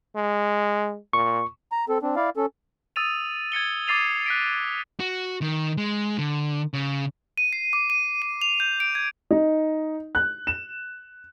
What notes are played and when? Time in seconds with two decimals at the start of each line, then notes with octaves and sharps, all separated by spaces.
0.15 G#3
1.13 A#2 C#6
1.72 A#5
1.89 C4 A4
2.02 C4 D4
2.16 E4 D5 F5
2.37 C#4 A4
2.96 D#6 E6 A6 D#7 F7
3.52 G#6 A6 C#7 G7
3.87 D6 D#6 A6 C7 D#7 F7
4.26 F#6 B6 D7
5.00 F#4
5.42 D#3
5.77 G#3
6.18 D3
6.73 C#3
7.38 D#7
7.53 C7
7.73 D6
7.90 D#7
8.22 D#7
8.42 F7
8.60 G6
8.80 D7
8.95 G#6
9.31 D#4
10.15 F#6
10.47 E7